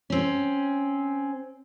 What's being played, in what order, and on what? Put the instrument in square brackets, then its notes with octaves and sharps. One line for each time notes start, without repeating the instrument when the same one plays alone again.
[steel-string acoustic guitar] C4 C#4